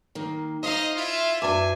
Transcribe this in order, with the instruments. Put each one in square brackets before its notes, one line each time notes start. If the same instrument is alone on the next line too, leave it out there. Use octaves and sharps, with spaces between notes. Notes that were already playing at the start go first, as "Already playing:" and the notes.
[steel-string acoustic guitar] D#3 A#3
[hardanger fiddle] D#4 F5 [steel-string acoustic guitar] C5 [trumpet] D#5
[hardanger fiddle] E4 E5 [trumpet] F4
[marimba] F#2 D6 [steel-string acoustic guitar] D4 B4 [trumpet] G#5